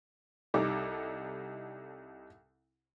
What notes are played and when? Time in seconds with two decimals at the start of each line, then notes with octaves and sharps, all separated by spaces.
0.54 C2 G3 D#4 A4 D6